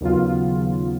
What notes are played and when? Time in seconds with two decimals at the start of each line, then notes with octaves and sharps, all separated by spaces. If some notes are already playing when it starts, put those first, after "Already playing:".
0.01 D#2 C#3 F#3 B3 F4